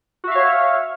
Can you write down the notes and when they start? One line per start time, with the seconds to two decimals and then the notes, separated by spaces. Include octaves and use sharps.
0.24 F#4
0.28 E5
0.31 F5
0.35 C#5